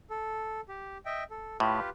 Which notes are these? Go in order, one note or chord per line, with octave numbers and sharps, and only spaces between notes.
A4
G4
D#5 E5 G5
A4
A2 F4 G4 B4